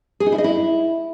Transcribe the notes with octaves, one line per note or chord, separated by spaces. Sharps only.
G#4
D#4
E4
D#5
E4